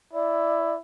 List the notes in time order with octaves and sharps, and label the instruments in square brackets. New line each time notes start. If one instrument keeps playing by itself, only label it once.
[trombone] E4 [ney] D5